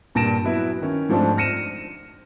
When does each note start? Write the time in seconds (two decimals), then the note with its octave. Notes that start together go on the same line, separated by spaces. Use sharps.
0.15 G2 A#2 A5 A#6 D7 E7
0.44 F#3 B3 E4 B4
0.81 D#3 C#4
1.09 G#2 F3 A3 C4 D4
1.37 F6 A#6 C#7 D#7 E7